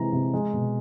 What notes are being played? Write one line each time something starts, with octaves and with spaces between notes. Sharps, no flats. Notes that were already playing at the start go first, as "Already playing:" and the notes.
Already playing: C3 E3 G#3 A#5
C3
G#3
B2